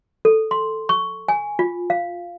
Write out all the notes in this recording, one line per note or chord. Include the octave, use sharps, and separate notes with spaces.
A4
C6
C#6
G#5
F4
F5